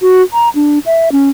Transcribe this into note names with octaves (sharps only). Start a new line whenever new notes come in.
F#4
A#5
D4
E5
C#4